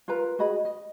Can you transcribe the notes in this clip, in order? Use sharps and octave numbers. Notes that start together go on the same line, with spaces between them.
F4 A#4 B4 A#5
F#4 G#4 D#5 B5
D#5